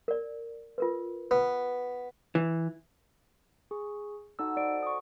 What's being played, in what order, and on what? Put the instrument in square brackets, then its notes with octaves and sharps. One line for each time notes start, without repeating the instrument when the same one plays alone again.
[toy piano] A#4 D5
F4 A#4 B4
[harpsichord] B3 [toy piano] B4
[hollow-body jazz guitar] E3
[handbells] G#4 C#6
[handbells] D#4 E6 [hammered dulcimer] F#4 A4 D#5
[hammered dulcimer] C5 [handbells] D5 D7
[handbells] C#6 D#6